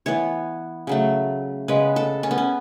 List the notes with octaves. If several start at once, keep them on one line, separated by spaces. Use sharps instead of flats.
E3 B3 C#5
C#3 F#3 A3
C#3 G#3 B3 B4
A4
C#4
B3
C#4